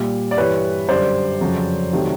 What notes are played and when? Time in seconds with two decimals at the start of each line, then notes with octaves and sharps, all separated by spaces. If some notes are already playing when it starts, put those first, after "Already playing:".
Already playing: A#2 G3
0.31 D5
0.37 G2 E3 G3 B4 C#5
0.89 F#2 D3 G3 C5 D5
1.41 F2 C#3 F#3
1.93 C3 D#3 F#3 A3